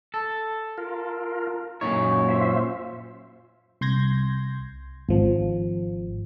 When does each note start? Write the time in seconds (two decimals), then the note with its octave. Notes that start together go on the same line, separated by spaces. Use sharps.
0.14 A4
0.78 F4 A#4
1.81 F#2 A#2 D#4 C#5
2.29 F4 C5 E5
3.81 C2 C6 G6 G#6 A#6
5.09 G#1 F3